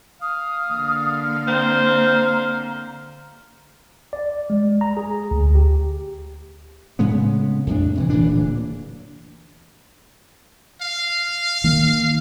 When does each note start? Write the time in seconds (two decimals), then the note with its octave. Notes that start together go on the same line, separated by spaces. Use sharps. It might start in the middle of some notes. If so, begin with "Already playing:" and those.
0.22 F5 D#6
0.69 D3 A#3
1.48 C4 A#5
4.13 D5
4.50 G#3
4.81 A#5
4.97 G#4
5.31 D2
5.55 G4
6.99 A2 C#3 G#3 B3
7.67 F2 A2 D4
7.95 C3 D#3 E3
8.10 D1 A#2 E3 D4
10.82 F5
11.64 D#3 A#3